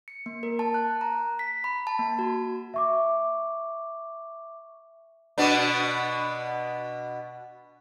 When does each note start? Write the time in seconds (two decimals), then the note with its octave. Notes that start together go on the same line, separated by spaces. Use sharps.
0.08 C#7
0.26 A#3
0.43 A#4
0.59 A5
0.74 F#6
1.01 A#5
1.39 B6
1.64 B5
1.87 A5
1.99 A#3
2.19 F#4
2.74 E5 C#6 D6
5.38 B2 B3 D4